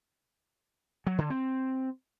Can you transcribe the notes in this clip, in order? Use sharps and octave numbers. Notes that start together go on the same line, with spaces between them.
F#3
D3
C4